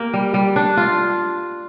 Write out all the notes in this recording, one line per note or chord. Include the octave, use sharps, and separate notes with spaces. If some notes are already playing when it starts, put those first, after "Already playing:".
Already playing: A#3 G4
G3
G3
D4
F4